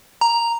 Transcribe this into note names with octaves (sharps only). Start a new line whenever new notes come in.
A#5